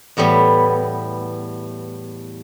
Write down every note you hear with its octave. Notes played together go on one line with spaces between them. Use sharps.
E2 A2 G3 B3